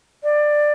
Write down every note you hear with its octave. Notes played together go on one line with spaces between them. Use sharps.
D5